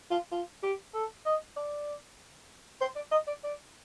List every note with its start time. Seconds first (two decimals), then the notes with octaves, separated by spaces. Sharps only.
0.11 F4
0.32 F4
0.63 G4
0.94 A4
1.25 D#5
1.56 D5
2.81 C5
2.96 D5
3.11 D#5
3.27 D5
3.44 D5